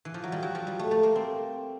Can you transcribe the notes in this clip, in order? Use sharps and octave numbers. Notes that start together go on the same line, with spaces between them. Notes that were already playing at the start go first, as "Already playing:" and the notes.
E3
F3
F#3
G3
F#3
F3
G3
A3
A3
A#3
C4